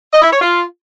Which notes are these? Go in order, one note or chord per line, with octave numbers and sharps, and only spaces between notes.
D#5
E4
C#5
F4